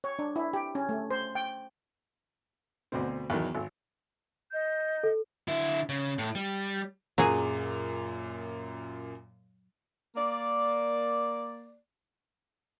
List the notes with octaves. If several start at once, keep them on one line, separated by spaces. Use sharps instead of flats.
C#5
D4
E4
G4
C#4
A3
C5
G5
D2 B2 C4
E2 B2 D#3 F#3
G#1
D#5 G6
A4
D3 E4
C#3
A2
G3
F#2 A#2 F#3 G#4
A#3 D5